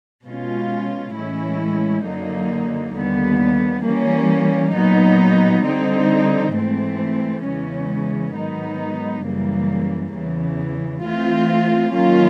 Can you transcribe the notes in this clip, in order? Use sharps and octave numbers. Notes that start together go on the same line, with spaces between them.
B2 G#3 C#4 F4
A2 E3 G#3 C#4 E4
F#2 D3 F#3 A#3 D#4
D#2 D3 G3 B3
E3 G3 A#3 C#4
A#2 F#3 B3 D#4
D3 G3 C4 D#4
G#2 E3 A3 C4
E2 C#3 E3 G#3 C#4
G#2 D#3 F#3 B3 D#4
F#2 C#3 E3 G3 A#3
E2 C#3 E3
E3 A3 C4 F4
D#3 F#3 A#3 C#4 F4